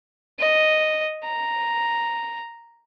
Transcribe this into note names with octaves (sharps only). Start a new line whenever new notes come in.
D#5
A#5